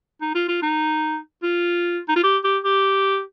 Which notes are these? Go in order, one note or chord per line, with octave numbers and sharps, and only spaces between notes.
D#4
F4
F4
D#4
F4
D#4
F4
G4
G4
G4